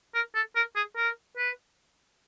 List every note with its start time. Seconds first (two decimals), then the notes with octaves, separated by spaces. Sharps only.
0.15 A#4
0.35 A4
0.56 A#4
0.76 G#4
0.97 A#4
1.37 B4